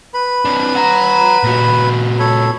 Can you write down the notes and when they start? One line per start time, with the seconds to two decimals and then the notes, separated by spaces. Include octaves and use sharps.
0.14 B4 B5
0.45 C4 D4
0.75 F#5 A#5
1.43 A#2 F#4
2.19 A4 C#5 B5